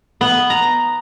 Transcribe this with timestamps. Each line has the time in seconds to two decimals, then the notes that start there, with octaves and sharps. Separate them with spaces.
0.21 B3
0.50 A#5